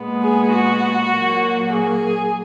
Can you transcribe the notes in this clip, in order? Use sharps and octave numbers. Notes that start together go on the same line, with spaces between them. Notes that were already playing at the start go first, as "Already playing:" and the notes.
Already playing: A#2 G#3 B3
G#4
F#4
A#2 F#3 A#3
G#4